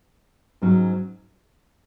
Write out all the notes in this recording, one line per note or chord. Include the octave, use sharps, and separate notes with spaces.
G#2 F#3 C#4